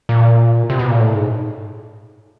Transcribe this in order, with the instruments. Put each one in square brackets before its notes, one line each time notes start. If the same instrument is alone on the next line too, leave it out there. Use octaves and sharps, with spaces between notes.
[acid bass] A#2
C3
B2
A#2
A2
G#2